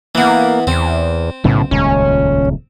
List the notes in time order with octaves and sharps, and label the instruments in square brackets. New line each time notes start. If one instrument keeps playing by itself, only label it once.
[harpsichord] E3 B3 [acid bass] A#3
[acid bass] E2 [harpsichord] C4
[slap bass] B1 C#3 B3 [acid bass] A2
[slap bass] D#1 C#2 [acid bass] C#4